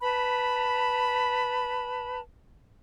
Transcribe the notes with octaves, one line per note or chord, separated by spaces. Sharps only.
B4 A5 B5